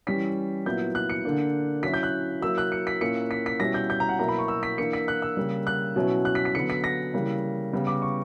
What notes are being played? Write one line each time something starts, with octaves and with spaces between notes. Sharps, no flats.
E3 G3 C#4 B6
A#2 F#3 B3 E4 G6
F#6
C#7
D3 A#3 D4
F#3 C#4 E4 B6
G6
F#6
F#3 A#3 E4 E6
F#6
C#7
B6
A#2 A#3 C#4 E4 C#7
B6
B6
B2 G3 C#4 E4 A#6
G6
G6
A#5
F#5
B2 F#3 A#3 E4 A#5
B5
C#6
E6
B6
E3 A#3 D4 C#7
B6
F#6
E6
C#3 G3 A#3
F#6
B2 F#3 C#4 E4
F#6
B6
B6
D3 F#3 B3 C#7
B6
A#6
C#3 E3 G3 A#3
C#3 G3 B3
D6
C#6